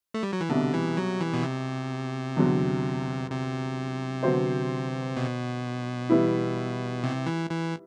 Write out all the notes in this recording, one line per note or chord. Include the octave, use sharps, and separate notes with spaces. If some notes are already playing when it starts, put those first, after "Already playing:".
A3
G3
F#3
E3
C2 B2 D3 G3
E3
F#3
E3
B2
C3
E2 D3 F#3
C3
D3 F#3 B3 F#4 C5
B2
E3 G3 B3 E4
C3
E3
E3